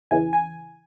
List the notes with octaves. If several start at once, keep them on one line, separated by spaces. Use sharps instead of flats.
E2 C#3 E3 G#5
G#5